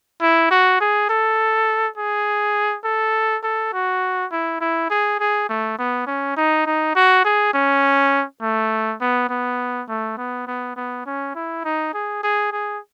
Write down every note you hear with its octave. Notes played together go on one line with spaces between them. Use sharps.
E4
F#4
G#4
A4
G#4
A4
A4
F#4
E4
E4
G#4
G#4
A3
B3
C#4
D#4
D#4
F#4
G#4
C#4
A3
B3
B3
A3
B3
B3
B3
C#4
E4
D#4
G#4
G#4
G#4